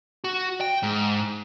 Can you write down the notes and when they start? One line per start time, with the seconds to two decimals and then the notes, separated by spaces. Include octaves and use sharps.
0.24 F#4
0.61 G5
0.83 G#2